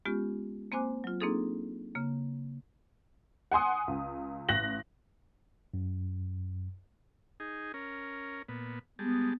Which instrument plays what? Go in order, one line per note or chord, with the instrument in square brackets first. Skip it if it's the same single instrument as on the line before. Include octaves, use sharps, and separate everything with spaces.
[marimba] G#3 B3 C#4 F4 G4
A#3 C4 C5 G#5 D6 F#6
F#3 F4
A#3 C4 D4 D#4 G#4 A4
C#3 A#3
[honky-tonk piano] F#5 G#5 C6 D#6
C#2
A1 F#6 A#6 F#7
[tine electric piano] F#2
[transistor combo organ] D#4 G#4
C#4 A#4
A#2 B3
[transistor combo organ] G3 G#3 A5 [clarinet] B3